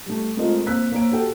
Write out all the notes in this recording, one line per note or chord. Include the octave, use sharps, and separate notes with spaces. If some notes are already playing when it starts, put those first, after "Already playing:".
G3 A3
G#3 A3 C4 F4 A#4 D#5
A#3 C4 E6 F#6 B6
A#3 C5 C#5 D7
F#4 G4 A4 F#5 G5